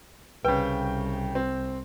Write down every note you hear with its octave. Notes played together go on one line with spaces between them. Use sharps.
C2 C#3 B4 G5
C4